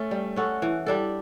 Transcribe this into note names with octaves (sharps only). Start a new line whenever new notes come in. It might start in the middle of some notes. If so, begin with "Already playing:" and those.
Already playing: A3 C#4 A4
G3
C#4 F#4 A4
E3
G3 D4 A4